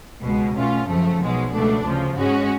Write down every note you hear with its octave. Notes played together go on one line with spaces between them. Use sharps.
C#2 B2 G#3
B2 A3 C#4 F4
F#2 C#3 F3 A3
B1 B2 G#3
C#2 B2 A3 D4
D2 C#3 F3
G#2 G#3 C#4 F#4